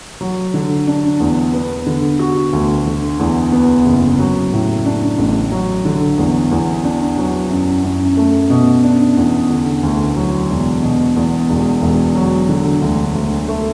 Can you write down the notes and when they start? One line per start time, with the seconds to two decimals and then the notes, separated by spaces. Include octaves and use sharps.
0.21 F#3
0.54 D3
0.87 D4
1.20 E2
1.53 B3
1.86 D3
2.19 F#4
2.53 D2
2.86 D3
3.19 E2
3.52 B3
3.86 F#1
4.19 F#3
4.53 A2
4.85 D4
5.18 A1
5.52 F#3
5.85 D3
6.18 E2
6.51 E2
6.84 D4
7.18 F#3
7.50 F#2
7.84 F#2
8.17 A3
8.50 B2
8.83 D4
9.17 E2
9.50 D3
9.83 D2
10.16 F#3
10.50 E1
10.83 B2
11.16 E2
11.49 E1
11.82 E1
12.15 F#3
12.49 D3
12.82 D2
13.15 D2
13.48 A3